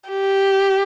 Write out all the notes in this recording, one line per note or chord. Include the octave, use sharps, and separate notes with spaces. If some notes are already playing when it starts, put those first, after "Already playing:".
G4